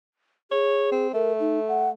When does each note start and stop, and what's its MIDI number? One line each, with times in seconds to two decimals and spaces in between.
0.51 1.07 68
0.51 0.87 73
0.92 1.12 60
1.14 1.92 57
1.14 1.33 70
1.40 1.59 63
1.68 1.89 78